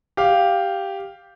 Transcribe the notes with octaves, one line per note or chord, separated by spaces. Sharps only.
G4 F5